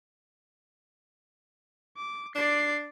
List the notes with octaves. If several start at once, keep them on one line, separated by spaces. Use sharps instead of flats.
D6
D4 D5 C7